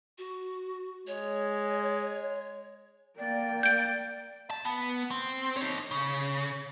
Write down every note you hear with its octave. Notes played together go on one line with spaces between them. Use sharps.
F#4
G#3 C#5
A#3 D5 G5
G6 D7
A5
B3
C4
D#4 C#5
C#3